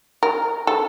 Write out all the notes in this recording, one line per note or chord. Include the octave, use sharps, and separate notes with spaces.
A#4
A4